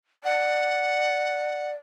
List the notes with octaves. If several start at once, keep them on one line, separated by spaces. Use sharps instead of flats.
D5 F#5